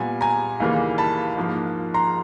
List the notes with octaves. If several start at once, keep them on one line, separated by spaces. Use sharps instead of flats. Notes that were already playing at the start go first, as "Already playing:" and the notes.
Already playing: A#2 G3 B3 G#5
G#5 A#5
D#2 C#3 E3 G3 A#3
A5 B5
G#2 F3 A#3
A#5 C6